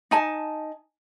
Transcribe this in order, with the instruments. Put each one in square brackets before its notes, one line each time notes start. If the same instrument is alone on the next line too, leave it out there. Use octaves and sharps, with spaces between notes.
[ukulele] D#4 G#5 A5